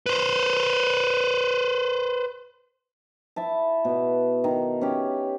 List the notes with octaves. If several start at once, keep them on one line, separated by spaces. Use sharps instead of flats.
B4 C5
E4 E5 A5
B2
D#3
C#4 G4